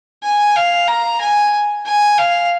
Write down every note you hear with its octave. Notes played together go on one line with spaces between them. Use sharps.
G#5
F5
A#5
G#5
G#5
F5